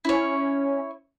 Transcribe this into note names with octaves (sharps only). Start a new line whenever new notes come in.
C#4 E4 C#5